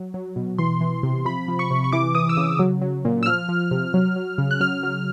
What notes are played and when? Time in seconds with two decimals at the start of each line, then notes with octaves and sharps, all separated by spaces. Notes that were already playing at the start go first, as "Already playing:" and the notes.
Already playing: F#3
0.14 F#3
0.36 B2
0.58 E3 C6
0.81 E3
1.03 C3
1.25 F3 B5
1.48 F3
1.59 C#6
1.70 C3
1.84 C#6
1.92 E3 D6
2.15 E3 D#6
2.29 E6
2.37 C#3 D#6
2.59 F#3
2.82 F#3
3.05 A#2
3.23 E6
3.26 F3 F6
3.49 F3
3.71 C3
3.94 F#3
4.16 F#3
4.38 C#3
4.51 F#6
4.60 F#3 F6
4.83 F#3